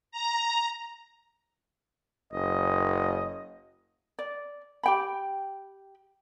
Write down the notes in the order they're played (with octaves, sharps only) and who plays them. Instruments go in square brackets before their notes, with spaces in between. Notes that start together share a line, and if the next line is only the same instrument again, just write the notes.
[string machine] A#5
[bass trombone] F#1 [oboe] D#5
[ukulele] D5
G4 G5 B5